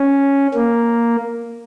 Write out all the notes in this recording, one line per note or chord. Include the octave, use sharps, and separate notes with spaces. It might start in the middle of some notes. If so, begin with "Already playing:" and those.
Already playing: C#4
A#3